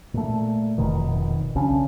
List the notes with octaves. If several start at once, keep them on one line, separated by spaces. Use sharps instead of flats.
A#2 A3
F1 B2 D#3
B1 C#3 C#4 D4